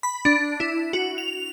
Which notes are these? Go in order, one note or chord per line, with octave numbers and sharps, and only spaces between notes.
B5
D4
E4
F#4
F7